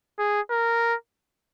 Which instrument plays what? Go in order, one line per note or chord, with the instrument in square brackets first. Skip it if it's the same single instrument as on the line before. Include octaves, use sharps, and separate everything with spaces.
[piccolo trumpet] G#4
A#4